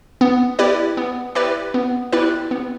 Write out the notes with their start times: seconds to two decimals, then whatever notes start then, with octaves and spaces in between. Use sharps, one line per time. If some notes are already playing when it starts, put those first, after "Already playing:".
0.21 B3
0.59 E4 G4 B4 D5
0.97 B3
1.35 E4 G4 B4 D5
1.74 B3
2.12 E4 G4 B4 D5
2.51 B3